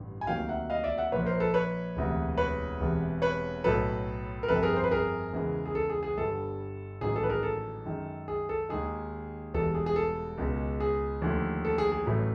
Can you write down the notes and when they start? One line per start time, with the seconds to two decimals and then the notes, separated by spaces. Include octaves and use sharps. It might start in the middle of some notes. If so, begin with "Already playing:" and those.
Already playing: A1 G2 D3 G3
0.21 G#5
0.27 D2 C3 D#3 F#3 A#3 F5 G5
0.49 E5 F#5
0.70 D#5 F5
0.84 D5 E5
0.97 E5 F#5
1.12 A#1 A#2 F3 A#3 B4 C#5
1.25 A#4 C5
1.40 A4 B4
1.54 B4 C#5
1.96 E1 D2 C3 E3
2.38 B4 C#5
2.80 E1 E2 C3
3.22 B4 C#5
3.64 B1 A2 F#3 A4 B4
4.43 A#4
4.48 G1 F2 C3 A4 B4
4.63 G#4 A#4
4.77 C5
4.84 B4
4.91 G#4 A#4
5.33 E2 C#3 E3 G#3
5.66 G#4
5.75 A4
5.90 G#4
6.03 G#4
6.17 G1 G2 D3 G3 A4
7.01 A1 G#2 D#3 F#3 G#4
7.16 A4
7.23 B4
7.29 G#4 A#4
7.43 A4
7.85 F#2 D#3 G#3
8.28 G#4
8.49 A4
8.69 D#2 D#3 G#3 G#4
9.54 E1 E2 B2 G3 A4
9.75 G#4
9.86 G#4
9.96 A4
10.38 C#2 B2 G#3
10.80 G#4
11.22 D#2 D3 F3 A3
11.65 A4
11.78 G#4
11.92 G#4
12.06 A1 A2 F#3 A3